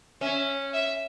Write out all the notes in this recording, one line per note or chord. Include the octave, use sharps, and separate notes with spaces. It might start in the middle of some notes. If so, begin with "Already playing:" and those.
C#4 E5
E5